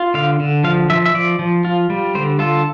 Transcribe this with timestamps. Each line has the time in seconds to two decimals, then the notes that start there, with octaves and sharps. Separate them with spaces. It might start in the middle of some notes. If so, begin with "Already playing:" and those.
Already playing: F4
0.14 D3 F5
0.40 D3
0.64 F3 F5
0.90 F3 E5
1.06 E5
1.15 F3 D5
1.39 F3
1.65 F4
1.90 G3
2.15 D3 C5
2.39 F4 A4